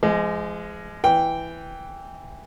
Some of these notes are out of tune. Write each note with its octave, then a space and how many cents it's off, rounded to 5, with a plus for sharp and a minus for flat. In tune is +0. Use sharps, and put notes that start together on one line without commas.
F3 -40 G#3 +0
E3 +5 G5 +0